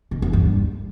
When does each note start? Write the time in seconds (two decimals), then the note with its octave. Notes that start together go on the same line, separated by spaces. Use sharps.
0.11 B2
0.22 E2
0.33 G2